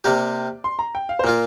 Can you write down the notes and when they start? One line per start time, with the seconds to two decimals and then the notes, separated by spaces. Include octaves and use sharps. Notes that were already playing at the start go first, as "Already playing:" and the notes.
0.04 C3 A#3 G4 D5
0.64 C6
0.79 A#5
0.95 G5
1.09 F5
1.19 C5
1.24 A#2 A#3 F4 A#4